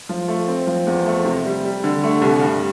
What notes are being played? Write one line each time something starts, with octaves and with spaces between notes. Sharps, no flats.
F3
A3
C4
F3
E2
A3
C3
G3
G3
D3
A3
C2
G2